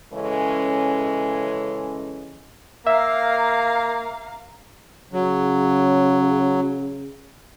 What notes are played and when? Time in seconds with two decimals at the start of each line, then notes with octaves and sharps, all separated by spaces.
0.13 C#3 E3 G#3 C#4 A4
2.87 A#3 E5 F5 A#5
5.13 C#3 F#3